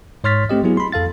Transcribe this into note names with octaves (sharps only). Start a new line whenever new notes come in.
G#2 C#5 C6 F6 A6 B6
A3 C4 G4 D#5
F#3 B3 E4 G#4
B5 C6
F2 A4 F5 A6